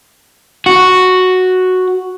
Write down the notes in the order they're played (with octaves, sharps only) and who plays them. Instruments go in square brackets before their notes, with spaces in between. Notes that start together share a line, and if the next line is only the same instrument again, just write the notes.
[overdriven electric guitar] F#4